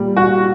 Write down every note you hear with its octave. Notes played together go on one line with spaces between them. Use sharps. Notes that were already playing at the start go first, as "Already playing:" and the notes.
Already playing: A#2 G3
F#4